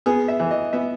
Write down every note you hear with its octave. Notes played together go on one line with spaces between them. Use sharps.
B3 G#4
E5
E3
D#5
B3 E5